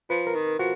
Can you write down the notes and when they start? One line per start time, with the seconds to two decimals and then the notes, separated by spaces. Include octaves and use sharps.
0.10 F3 B4
0.27 A#4
0.35 D#3
0.59 F3 F#4